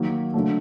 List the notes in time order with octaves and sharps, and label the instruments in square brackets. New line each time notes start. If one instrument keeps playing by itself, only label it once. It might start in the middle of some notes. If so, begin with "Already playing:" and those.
Already playing: [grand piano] D#3 F#3 A#3
D3 F#3 A3